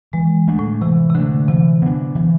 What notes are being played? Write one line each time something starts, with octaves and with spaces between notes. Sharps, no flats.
E3 G#3
A3 D4
A2
C3 E3
C3
D3 A3 D4
C3 E3
B3 D4
E3